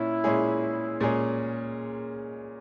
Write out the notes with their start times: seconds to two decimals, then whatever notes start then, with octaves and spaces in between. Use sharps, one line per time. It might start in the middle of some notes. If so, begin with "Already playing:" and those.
Already playing: A#2 C#4 E4
0.24 A#2 G#3 C#4 G#4
1.00 A#2 G#3 C#4 G#4